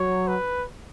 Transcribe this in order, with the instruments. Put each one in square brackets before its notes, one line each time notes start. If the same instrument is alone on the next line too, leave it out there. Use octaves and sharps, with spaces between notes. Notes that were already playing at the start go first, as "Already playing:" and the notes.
Already playing: [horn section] F#3 [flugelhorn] C#5
[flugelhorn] B4